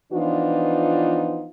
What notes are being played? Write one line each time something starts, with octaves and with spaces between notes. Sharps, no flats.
E3 F3 B3 D4 D#4 F4